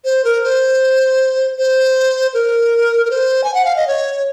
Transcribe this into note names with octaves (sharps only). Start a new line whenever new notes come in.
C5
A#4
C5
C5
A#4
A#4
C5
G#5
F#5
F5
D#5
C#5